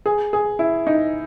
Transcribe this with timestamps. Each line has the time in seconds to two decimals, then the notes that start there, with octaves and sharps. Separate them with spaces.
0.06 G#4
0.33 G#4
0.59 E4
0.87 D#4